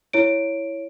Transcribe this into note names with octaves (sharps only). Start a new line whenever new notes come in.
E4 C#5 D7